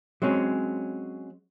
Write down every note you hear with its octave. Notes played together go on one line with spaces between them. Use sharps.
F#3 G#3 C4 C#4